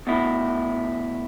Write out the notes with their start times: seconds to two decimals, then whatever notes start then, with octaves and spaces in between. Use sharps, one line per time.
0.07 B2 A3 E4